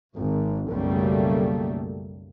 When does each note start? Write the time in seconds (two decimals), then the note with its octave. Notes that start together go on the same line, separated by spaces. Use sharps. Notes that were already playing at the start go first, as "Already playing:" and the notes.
0.15 G#1
0.71 B1 F#2 C#3 G3 A3 A#3